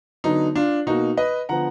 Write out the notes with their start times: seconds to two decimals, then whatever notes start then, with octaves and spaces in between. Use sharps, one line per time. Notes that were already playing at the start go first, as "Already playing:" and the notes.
0.24 D3 F#3 B3 D#4
0.56 D4 F4
0.86 B2 A#3 D#4 F#4
1.17 B4 D#5
1.49 D3 F3 B3 F#5 A#5